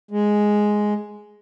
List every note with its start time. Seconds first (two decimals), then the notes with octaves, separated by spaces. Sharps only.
0.11 G#3